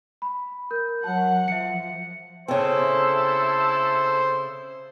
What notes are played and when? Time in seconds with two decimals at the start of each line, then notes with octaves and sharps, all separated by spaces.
0.22 B5
0.71 A#4 G6
1.04 F#3 F#5 A5
1.48 F3 E5 C#7
2.48 C#3 A3 C4 E4 A4 C5